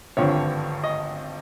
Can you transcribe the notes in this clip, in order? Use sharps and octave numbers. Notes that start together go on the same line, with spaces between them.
G#1 G2 D3 F3 C#5
D#5